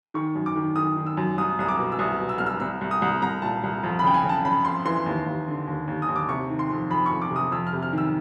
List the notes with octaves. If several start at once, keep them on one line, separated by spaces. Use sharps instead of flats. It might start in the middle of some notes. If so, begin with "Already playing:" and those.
D#3 C#6
F#2
D6
D#3
D#3 D#6
D#3
E6
F#2
C2 D#6
C2 D#6
D6
B2
E6
C2 D#6
B2
E6
C2 F6
E6
C2 E6
C2
D#6
C2
C2 A#5
A#2 A5
C2
F2
B5
C#3 G5
G#5
C#3
A5
C#3 B5
F2 C6
E3 C6
D#2
D#2
D3
D#2
D#2
D#6
D#2
D6
C3 C#6
D#3
C6
F2
F2 B5
C#6
F2
D6
C3
D#6
F2 E6
F6
C3
F6
D#3 E6